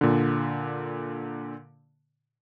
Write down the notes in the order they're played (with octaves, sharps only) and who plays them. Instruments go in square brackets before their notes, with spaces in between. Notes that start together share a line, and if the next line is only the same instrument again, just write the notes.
[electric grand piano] A#2 D3